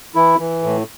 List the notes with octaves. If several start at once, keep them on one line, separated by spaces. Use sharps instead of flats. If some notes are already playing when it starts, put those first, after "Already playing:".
E3 E4
E3
A2